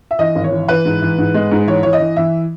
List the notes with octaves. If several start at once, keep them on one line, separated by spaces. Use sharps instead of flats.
E5
E3 D#5
G#1
C#5
E3
E3 B4
G#2
E3
G#2
G#3
G#2
E3 C#5
E3 C#5
D#5
E3
E3 E5